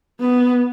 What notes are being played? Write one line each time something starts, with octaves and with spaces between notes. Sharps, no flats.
B3